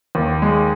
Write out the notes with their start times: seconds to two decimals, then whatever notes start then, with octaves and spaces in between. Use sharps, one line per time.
0.15 D#2
0.42 G#3